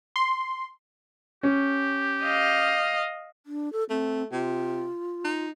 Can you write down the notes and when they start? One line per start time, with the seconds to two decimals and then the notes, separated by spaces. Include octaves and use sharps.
0.16 C6
1.43 C#4 G4
2.23 D#5 F5
3.46 D4
3.73 A4
3.90 A3 C4
4.32 C3 F4
5.25 D#4